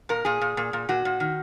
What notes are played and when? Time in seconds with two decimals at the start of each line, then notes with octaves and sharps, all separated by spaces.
0.09 A#2 A#4
0.25 A#2 G#4
0.41 A#2
0.57 A#2
0.73 A#2
0.89 A#2 F#4
1.05 A#2
1.20 D#3